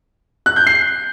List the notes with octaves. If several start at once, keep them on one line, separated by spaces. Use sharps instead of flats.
F#6
G6
C7